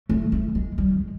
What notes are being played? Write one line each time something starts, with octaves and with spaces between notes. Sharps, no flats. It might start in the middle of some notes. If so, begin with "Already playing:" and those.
A3
A3
G#3
G3
G#3